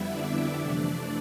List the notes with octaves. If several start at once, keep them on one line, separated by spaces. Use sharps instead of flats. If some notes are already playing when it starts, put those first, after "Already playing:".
Already playing: F2 D3 G3 B3 E4 E5
D4 D5
F2 C3 E3 A3